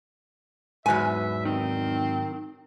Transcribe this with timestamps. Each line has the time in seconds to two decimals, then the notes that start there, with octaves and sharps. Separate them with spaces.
0.86 E2 G#2 F#3 B4 E5 G#5
1.45 D#3 C4